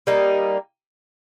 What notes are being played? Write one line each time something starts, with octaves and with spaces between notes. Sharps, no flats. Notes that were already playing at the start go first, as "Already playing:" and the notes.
G3 A#3 D#4